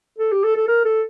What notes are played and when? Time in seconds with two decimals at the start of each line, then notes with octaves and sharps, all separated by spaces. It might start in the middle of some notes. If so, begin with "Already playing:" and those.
0.18 A4
0.32 G4
0.43 A4
0.56 A4
0.68 A#4
0.85 A4